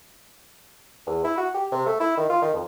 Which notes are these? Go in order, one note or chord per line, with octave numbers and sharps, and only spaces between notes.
E2
E4
F#4
G4
C3
A3
E4
D#3
F4
D#3
F2